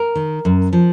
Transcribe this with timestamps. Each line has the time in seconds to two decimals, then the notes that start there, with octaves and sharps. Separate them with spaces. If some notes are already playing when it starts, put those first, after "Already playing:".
Already playing: A#4
0.15 D#3
0.45 F#2
0.73 F3